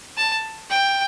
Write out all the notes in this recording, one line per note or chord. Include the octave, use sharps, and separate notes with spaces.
A5
G5